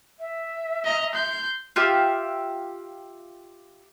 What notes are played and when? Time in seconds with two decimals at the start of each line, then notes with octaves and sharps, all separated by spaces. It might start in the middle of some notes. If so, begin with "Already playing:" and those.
0.19 E5
0.85 D#5 A#5
1.14 C6 G6
1.76 F4 G4 E5